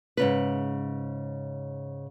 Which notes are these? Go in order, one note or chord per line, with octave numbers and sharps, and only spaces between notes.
G#2 C#3 B4